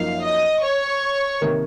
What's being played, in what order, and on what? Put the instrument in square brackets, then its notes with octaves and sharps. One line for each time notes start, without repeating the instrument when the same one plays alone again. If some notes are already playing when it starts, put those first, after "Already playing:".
Already playing: [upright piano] F#2 F3 A#3 D#4 [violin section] F5
[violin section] D#5 D#6
C#5 C#6
[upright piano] C3 D#3 A#3